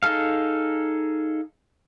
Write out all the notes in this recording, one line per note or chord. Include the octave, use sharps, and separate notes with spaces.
D#4 G#4 A4 F5